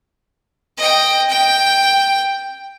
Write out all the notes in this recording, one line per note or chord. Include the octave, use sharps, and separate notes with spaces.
D#5 G5
G5